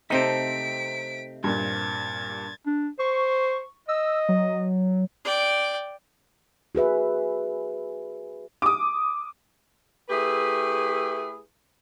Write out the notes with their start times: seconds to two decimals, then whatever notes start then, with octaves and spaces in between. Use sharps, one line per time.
0.10 C3 A3 C4 D#4 B6 D7
1.44 G2 A#2 G#6 A6
2.66 D4
2.99 C5 C#6
3.89 D#5 E6
4.29 F#3
5.25 D5 G5
6.75 F#4 G#4 B4 E5
8.62 D6 D#6
10.10 A3 E4 G4 G#4 B4